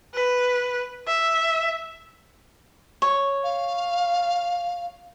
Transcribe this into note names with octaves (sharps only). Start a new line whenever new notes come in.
B4
E5
C#5
F5